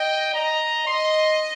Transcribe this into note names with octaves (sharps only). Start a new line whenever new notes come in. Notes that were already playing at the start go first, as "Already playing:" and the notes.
Already playing: D#5 G5
D#5 A#5
D#5 C6